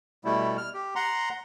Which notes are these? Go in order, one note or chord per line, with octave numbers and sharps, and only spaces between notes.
B2 G3 A3 E4
F6
G4
F#5 A#5 C6